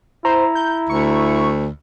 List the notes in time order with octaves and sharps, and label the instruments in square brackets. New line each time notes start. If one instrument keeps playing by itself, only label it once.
[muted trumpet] E4 [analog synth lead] C5 [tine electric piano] A#5
[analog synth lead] G6
[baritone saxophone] D2 [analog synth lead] C#6